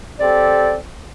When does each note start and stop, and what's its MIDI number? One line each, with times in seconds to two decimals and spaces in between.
0.20 0.75 60
0.20 0.75 67
0.20 0.75 69
0.20 0.76 74